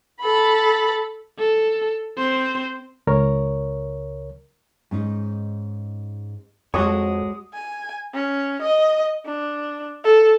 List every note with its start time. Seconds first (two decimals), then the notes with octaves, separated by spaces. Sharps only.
0.21 A4 B5
1.38 A4
2.18 C4 C5
3.07 C#2 A#4 C#5
4.91 G#2 C#4 D#4
6.74 F2 G#3 F#4 A4 C#5 D#6
7.54 G#5
8.13 C#4
8.62 D#5
9.25 D4
10.04 A4